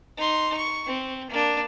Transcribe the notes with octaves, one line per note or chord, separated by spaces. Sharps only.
D#4 C6
C#6
C4
A#3 D4